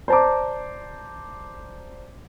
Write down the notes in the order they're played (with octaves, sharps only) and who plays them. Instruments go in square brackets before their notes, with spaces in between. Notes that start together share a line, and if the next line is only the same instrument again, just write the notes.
[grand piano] C5 D5 A5 A#5 D6